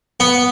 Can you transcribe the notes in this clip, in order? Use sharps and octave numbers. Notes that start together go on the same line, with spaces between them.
B3